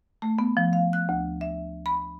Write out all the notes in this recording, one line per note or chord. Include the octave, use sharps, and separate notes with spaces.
A3
B3
F3
F5
F#6
D2
E5
B5